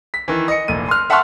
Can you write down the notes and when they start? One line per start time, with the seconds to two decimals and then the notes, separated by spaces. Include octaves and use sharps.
0.14 B6
0.28 D#3 E3
0.48 D#5 C#7
0.68 F1 A#2 D#7
0.88 C6 F6
1.10 E5 F#5 A5 C6 C#6 F6